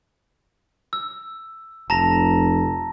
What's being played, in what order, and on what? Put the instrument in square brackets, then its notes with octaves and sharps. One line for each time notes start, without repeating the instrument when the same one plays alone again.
[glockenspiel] E6
[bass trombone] F1 [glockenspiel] A5 A#5 A#6